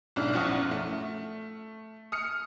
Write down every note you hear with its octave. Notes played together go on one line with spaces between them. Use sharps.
B1 G#2 D4 E4 F6
A#1 F#2 F3 F#5 C#6 D#6
A3
D#6 F6 C#7